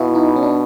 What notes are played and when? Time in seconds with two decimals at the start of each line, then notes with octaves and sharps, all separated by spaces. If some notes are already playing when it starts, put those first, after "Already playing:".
Already playing: B2 E4 F4
0.15 D#4
0.36 C#4
0.43 D4